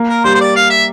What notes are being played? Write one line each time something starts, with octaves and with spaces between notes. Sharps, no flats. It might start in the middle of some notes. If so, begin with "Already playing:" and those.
Already playing: A#3
A#4
G3 C5
C5
D5
F5
E5